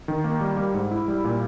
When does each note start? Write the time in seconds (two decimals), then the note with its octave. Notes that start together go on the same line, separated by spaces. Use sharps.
0.08 D#3
0.24 A#3
0.41 G3
0.57 G3
0.74 G#2
0.91 E4
1.08 G3
1.24 A#2